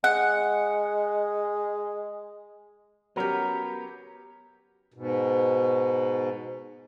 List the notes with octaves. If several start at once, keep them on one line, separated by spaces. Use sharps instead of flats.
G#3 F#5
F#3 B3 C#4 G4 A#4
G#2 B2